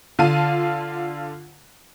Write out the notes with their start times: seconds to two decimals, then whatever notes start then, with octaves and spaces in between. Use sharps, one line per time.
0.19 D3 F4 F5 A5 D#7